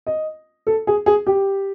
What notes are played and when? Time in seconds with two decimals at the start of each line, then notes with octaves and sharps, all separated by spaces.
0.07 D#5
0.67 A4
0.87 G#4
1.06 G#4
1.27 G4